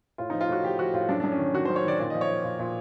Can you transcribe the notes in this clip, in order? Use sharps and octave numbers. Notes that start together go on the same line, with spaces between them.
A2 F4
F3 D#4
F4
A2 F#4
F3 G4
F3 F#4
A2 F4
F#2 D4
F#2 D4
C#4
D#3
D#3 F#4
F#2 C5
C#5
D#3 D5
A#2 D5
F3 D#5
C#5
F3
A#2
A#2